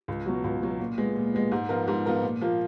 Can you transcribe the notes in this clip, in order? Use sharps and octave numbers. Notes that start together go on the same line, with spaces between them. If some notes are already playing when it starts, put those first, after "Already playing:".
C#2
B2 F#3
C#2
B2 F#3
A#2
G#3 B3
A#2
G#3 B3
G#2
F3 B3 F4 A#4
G#2
F3 B3 F4 A#4
A#2
F3 A#3 F4